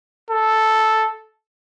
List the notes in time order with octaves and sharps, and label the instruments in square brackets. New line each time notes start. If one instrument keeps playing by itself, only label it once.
[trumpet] A4